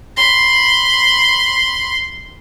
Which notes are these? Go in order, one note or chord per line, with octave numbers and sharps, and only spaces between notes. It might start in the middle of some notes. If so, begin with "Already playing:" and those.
B5 C6